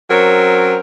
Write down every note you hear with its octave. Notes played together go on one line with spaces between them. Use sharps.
F#3 C4 C#4 A#4